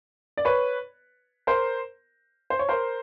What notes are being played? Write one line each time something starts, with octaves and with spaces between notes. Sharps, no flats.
D5
B4 C#5
A#4 C5
C5
C#5
A#4 C5